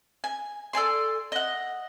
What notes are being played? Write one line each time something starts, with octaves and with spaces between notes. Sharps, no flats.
G#5
A4 D5 G#5 C6
D#5 F#5